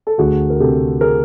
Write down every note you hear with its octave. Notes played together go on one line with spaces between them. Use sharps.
A4
D2 F#4 G#4
A#4
C3 G4 A4
G#4 A#4